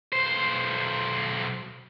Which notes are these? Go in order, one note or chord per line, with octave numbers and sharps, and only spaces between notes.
B1 C5